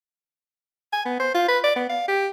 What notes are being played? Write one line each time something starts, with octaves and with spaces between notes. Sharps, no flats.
G#5
B3
C5
F4
B4
D5
B3
F5
G4